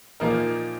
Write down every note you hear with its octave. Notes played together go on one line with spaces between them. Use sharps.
A#2 F3 A#3 D#4 A#4